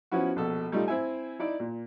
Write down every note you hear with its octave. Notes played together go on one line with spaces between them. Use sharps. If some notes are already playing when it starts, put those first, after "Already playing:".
F3 B3 C#4 E4 F#4
A#1 B2 A4
G3 A3 D#4 F4
C4 E4 E5 G#5
D#4 E4 D5
A#2